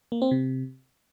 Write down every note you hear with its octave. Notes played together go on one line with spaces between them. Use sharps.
A#3
C4
C3